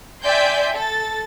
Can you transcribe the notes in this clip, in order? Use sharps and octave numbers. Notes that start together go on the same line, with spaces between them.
D5 E5 G5 G#5 C6 G6
A4 A6